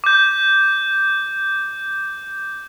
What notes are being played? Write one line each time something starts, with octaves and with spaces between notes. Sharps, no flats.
D6 G6